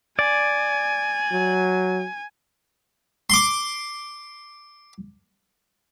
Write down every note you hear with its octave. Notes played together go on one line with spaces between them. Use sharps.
D5 G#5
F#3
C6 D6